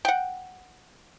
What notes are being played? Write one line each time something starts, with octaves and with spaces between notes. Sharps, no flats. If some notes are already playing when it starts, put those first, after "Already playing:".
F#5 G5